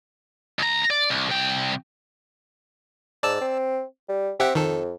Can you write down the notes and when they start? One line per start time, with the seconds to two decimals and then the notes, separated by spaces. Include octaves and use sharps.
0.59 C#2 A#5
0.90 D5
1.10 C2
1.29 C2 G5
3.23 G#2 D5 A5 E6
3.41 C4
4.09 G3
4.40 C4 G4 E5 F#5
4.55 F2 D#3 A4